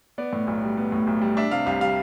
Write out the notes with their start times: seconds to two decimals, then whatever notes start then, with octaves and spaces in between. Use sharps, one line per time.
0.18 B3 D5
0.33 A2
0.47 B1
0.62 G3
0.77 B3
0.92 A2
1.07 B1
1.21 G3
1.37 D4 E5
1.51 C3 F5
1.66 C2 F5
1.81 G3 F5